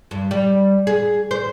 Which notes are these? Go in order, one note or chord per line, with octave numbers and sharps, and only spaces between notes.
G2
G3
G#4
C5